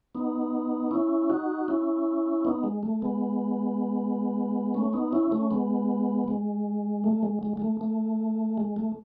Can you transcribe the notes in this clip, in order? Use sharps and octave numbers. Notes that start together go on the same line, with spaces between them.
B3 D#4
C#4 E4
D#4 F#4
C#4 E4
B3 D#4
G#3
A3
G#3 B3
A3 C#4
B3 D#4
C#4 E4
A3 C#4
G#3 B3
G#3
A3
G#3
G#3
G#3
A3
A3
G#3
A3